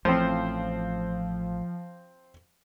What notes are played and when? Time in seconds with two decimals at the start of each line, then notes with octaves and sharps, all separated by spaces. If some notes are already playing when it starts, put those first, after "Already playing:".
0.05 A1 A2 F3 C4 C5